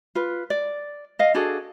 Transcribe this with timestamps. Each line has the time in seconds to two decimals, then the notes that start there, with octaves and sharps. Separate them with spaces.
0.15 F4 B4
0.50 D5
1.19 D#5 F5
1.34 D4 F#4 G#4 A4